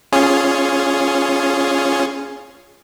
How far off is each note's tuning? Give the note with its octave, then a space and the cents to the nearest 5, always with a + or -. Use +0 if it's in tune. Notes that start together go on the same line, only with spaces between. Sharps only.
C#4 +0 F4 +0 G#4 +0